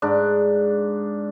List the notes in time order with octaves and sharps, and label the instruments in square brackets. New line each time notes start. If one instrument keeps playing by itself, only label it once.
[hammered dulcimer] G#2 D4